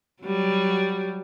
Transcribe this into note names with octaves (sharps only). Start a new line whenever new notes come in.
F#3 G3